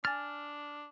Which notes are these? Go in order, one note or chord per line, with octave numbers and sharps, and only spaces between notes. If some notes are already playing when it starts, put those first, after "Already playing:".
D4 G#5 F6 A6